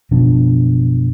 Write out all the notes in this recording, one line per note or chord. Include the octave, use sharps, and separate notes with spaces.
F#1 B2 F3 D4